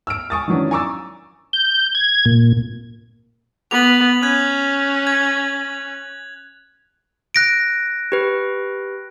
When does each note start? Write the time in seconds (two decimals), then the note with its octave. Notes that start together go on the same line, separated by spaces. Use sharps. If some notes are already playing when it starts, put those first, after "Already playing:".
0.07 E6 F6 D7
0.30 G#5 C#6 D#6 A6
0.48 D#3 E3 F#3 C#4 D4
0.71 G#5 A#5 C#6 D6 E6 A6
1.53 G6
1.95 G#6
2.25 A#2
3.71 B3 F7 F#7
4.23 C#4 F#6 G#6
5.07 G#6
7.35 F#6 A#6 D7
8.12 G4 B4